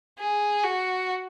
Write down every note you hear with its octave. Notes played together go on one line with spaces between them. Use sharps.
G#4
F#4